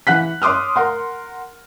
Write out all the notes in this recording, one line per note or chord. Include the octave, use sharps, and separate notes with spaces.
E3 F#5 F#6 B6
C#5 C6 D6 D#6 F6
A#4 F#5 C6